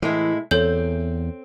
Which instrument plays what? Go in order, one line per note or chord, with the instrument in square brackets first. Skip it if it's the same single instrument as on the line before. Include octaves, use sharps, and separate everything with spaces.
[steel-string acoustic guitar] A2 G#3 E4 [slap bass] E3
[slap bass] E2 [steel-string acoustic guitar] C4 [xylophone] A4 C#5 G6